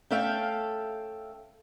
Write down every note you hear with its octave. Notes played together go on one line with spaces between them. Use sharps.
A3 C#4 A4 E5 F5 G5